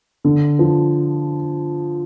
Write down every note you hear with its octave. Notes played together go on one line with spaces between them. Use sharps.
D3
F3